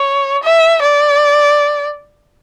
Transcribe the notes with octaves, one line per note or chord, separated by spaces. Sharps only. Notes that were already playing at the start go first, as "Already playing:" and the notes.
Already playing: C#5
E5
D5